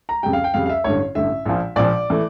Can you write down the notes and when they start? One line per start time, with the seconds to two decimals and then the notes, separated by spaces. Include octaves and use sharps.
0.09 A#5
0.23 F2 C#3 G3 G5
0.33 F5
0.44 G5
0.54 F2 C#3 G3 F5
0.66 F5
0.69 E5
0.84 A1 G2 D3 C#5
1.15 A1 G2 D3 E5
1.46 A#1 A#2 F3
1.76 A#1 A#2 F3 D5
2.10 E3 A3